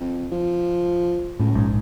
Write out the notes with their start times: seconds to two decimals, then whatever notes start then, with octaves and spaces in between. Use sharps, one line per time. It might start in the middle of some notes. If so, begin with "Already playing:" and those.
0.01 F2
0.32 F3
1.40 C#2 A2
1.55 A#1 G#2